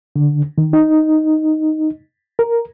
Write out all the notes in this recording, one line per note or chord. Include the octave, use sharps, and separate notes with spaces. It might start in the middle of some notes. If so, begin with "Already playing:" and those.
D3
D#3
D#4
A#4